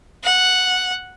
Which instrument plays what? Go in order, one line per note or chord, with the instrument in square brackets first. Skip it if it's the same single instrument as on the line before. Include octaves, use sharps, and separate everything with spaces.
[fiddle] F#5